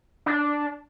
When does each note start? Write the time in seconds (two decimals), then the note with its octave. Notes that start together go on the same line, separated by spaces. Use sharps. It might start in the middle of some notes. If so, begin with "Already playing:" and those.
0.26 D4